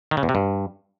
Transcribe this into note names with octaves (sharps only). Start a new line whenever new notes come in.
D#3
C#3
E2
C3
G2